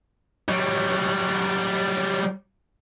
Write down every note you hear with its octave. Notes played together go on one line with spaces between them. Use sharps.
F#3 G3